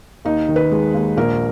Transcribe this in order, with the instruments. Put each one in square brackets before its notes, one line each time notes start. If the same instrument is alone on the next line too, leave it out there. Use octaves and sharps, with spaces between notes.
[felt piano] D#2 D#4
D#3
B4
G#3
D#2
A#1 A#4